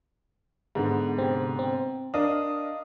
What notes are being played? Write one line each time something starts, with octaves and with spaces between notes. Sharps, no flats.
G#2 D3 B3
C3 C4
C4
D4 A#4 D#5 F5 D#6